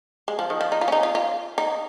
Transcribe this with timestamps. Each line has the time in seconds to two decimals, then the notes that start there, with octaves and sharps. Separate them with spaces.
0.28 G#3
0.39 F3
0.50 D#3
0.61 F3
0.72 D#4
0.81 F4
0.88 C#4
0.92 D#4
1.03 F4
1.15 F4
1.58 D#4